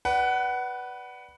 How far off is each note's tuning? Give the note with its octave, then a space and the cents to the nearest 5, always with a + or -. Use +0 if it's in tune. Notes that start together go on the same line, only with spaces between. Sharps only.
B4 -10 D5 +0 F#5 +20